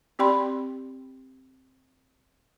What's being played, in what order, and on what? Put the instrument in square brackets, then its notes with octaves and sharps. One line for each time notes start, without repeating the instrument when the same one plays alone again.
[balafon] C4 G4 D5 G5 B5 C6